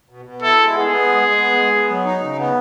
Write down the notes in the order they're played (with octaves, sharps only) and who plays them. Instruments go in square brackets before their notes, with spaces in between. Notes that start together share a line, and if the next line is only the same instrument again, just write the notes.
[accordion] B2
B2
[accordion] E4 [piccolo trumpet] A4
[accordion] G#3
[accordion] B3 [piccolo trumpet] G#4
[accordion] B3
G#3
G#3
B3
G#3
B3
F#3
D#4
C#3
B3